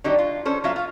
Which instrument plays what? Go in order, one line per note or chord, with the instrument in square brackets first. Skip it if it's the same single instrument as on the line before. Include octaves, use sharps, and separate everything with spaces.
[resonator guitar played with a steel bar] D3 F#3 G3 A3 D#4 G4
F4
C#4 A4 C5
F#3 B3 F4 E5 F5
F4 F5